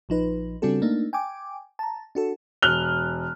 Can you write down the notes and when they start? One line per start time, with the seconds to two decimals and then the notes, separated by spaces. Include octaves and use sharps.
0.09 A#1 F3 D#4 B4
0.62 C#3 G3 C4 D4 F#4 A4
0.82 A3 A#3 D4 D#4
1.13 G5 G#5 D6
1.79 A5 A#5
2.15 D4 F#4 A4
2.63 E1 F6 F#6 G7